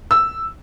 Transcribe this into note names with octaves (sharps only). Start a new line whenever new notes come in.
E6